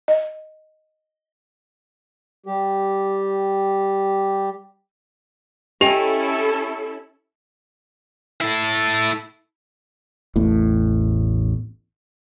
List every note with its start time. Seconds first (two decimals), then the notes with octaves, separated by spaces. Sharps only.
0.08 D#5
2.46 G3 G4
5.81 C#4 E4 G4 A4 D#5 G5 G#5 F7
8.41 E4 A4
10.36 A1 E2 A2